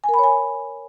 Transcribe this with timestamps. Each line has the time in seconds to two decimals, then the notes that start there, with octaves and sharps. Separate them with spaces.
0.04 G#5
0.09 A#4
0.14 B5
0.19 C#5
0.24 G#5